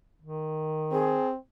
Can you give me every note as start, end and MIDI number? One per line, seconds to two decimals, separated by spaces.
0.22 1.22 51
0.92 1.36 60
0.92 1.28 68